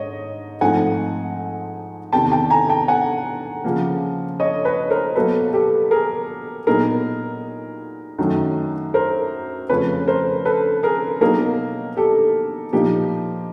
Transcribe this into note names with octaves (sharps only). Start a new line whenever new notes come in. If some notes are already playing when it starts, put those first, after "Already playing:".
Already playing: G#2 C#5 D#5
G#2 F3 A3 C4 D#4 F#5 G#5
E2 C3 D#3 G5 A5
G5 A5
G#5 A#5
G5 A5
F#5 G#5
C#3 F3 A#3
C#5 D#5
B4 C#5
A#4 C5
B2 F#3 A#3 A4 B4
G4 A4
G#4 A#4
A#2 F#3 B3 D#4 G#4 A#4
F#2 D#3 F#3 A3
A#4 C5
F2 C#3 F3 A3 C#4 B4 C#5
A#4 C5
A4 B4
G#4 A#4
B2 F#3 A#3 D#4 G#4 A#4
G4 A4
A#2 F3 A#3 D#4 G4